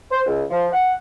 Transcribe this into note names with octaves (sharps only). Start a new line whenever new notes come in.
C5
C#2
F3
F#5